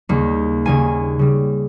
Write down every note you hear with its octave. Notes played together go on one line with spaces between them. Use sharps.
D#2 C#3 G3 A#3
D#2 C#3 G3 A#3 G#5
C#3 G3